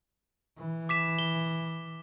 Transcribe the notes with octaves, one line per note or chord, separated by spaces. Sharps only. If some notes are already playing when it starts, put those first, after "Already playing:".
E3
D6 B6 E7
G7